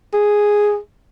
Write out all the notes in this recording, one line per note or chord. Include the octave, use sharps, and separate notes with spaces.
G#4